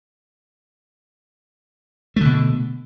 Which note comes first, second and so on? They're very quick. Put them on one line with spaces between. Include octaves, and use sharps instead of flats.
A3 D3 B2